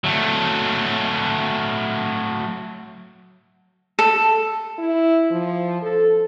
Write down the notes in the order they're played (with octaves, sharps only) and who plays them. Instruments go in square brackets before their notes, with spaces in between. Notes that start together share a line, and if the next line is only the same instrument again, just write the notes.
[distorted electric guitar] F#3 A3
[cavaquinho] A4
[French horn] E4
F3
A4